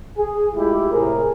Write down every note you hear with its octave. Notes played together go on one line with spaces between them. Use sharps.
G#4
G#3 A3 E4 F4 G4
A2 C3 G#4 A#4